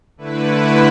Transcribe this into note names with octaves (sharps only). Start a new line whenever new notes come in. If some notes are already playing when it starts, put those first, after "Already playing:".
D3 A3 E4 B4